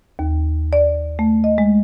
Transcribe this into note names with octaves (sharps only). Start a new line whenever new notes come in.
D#2
D5
A3
D#5
G#3